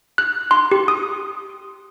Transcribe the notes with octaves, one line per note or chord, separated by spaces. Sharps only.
F#6
C6
G4
D#6